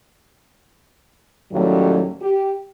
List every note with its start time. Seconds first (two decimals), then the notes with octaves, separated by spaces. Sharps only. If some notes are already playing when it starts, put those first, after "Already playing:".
1.52 D#2 A2 F#3 G3 C#4
2.21 G4